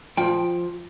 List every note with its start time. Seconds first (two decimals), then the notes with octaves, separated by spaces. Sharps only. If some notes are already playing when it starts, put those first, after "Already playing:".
0.17 F3 G5